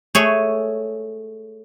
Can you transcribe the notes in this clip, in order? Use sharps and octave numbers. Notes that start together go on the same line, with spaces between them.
A3 G#4 C#5